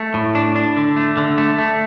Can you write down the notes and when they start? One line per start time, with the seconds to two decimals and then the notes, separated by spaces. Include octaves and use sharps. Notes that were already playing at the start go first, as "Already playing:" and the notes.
Already playing: A3
0.14 A2
0.35 D4
0.56 D4
0.77 D3
0.97 A3
1.17 D3
1.38 A3
1.58 A3